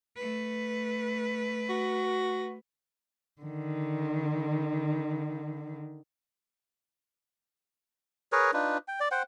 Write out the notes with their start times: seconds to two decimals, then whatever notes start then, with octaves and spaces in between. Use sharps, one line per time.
0.16 A3 B4
1.69 F#4
3.42 D3 D#3
8.32 G#4 A#4 B4 C#5
8.53 D4 D#4 F4 B4
8.88 G5
9.00 D5
9.11 C5 F#5 G5